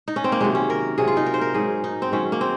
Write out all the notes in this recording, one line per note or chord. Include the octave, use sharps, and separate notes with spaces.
D#4
C#4
C4
A#3
C3 D#3 F#3 G#3
C#4
A#4
C3 F#3 G#4
F4
D#4
A#4
C5
A#4
G#2 F#3 G#4
D#4
C4
G#2 D#3 F#3 C#4
A#3
C4